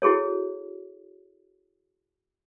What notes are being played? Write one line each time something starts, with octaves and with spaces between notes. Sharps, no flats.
E4 F#4 G#4 A4 C#5